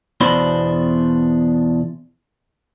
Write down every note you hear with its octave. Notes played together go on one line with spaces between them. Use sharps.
E2 B2 D4 C5 B5